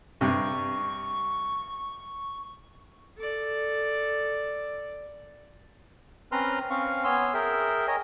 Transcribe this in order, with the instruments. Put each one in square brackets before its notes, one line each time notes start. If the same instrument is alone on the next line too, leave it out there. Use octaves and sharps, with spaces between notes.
[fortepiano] G2 C3 [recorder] C#6
[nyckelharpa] A4 D5
[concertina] C4 C#4 B4 A#5 C6 F6
C4 C#4 F5 C#6 F6
B3 C#5 G#5 C6 E6 F6
G#4 A#4 E5 G5
A#4 C#5 D#5 G#5